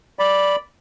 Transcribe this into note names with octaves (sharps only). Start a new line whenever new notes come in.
D5 B5